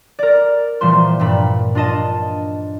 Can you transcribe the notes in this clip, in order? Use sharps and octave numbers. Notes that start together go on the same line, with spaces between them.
A#4 D5
A#2 E3 F3 G3 C5 C6
G2 A#2 B5
D4 F4 D#5 A5